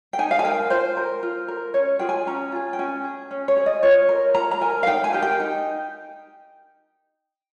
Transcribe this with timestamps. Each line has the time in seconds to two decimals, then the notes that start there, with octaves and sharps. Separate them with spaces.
0.13 G5
0.19 D#4 G#5
0.31 F5
0.39 G#5
0.44 A#4 G5
0.70 F4 C5
0.97 A#4
1.23 F4
1.48 A#4
1.74 C#4 C#5
1.99 F4 G#4 G5
2.09 G#5
2.27 C#4 A#5
2.52 F4 G#4
2.73 G5
2.79 C#4 G#5
3.04 G#4
3.31 C#4
3.48 C#5
3.57 G#4
3.66 D#5
3.83 F4 C#5
4.09 A#4
4.35 F4 A#5
4.51 A#5
4.61 A#4 G#5
4.83 F5
4.87 D#4 G5
5.04 G#5
5.13 G4 A#4
5.22 G5
5.40 D#4